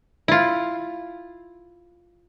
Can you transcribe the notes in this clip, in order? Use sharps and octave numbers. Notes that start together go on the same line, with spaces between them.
E4 F4